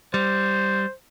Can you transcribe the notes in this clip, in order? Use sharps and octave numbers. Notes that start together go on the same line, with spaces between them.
G3 C5